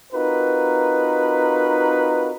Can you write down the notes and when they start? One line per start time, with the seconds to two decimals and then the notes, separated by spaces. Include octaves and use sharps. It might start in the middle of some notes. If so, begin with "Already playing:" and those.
0.13 C4 D#4 F4 F#4 A#4 B4